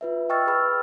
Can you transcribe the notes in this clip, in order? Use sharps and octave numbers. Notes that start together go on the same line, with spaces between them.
F4 B4 E5
D#5 G5 C#6 E6 F6 A6
G#4 B4 B5 E6 F6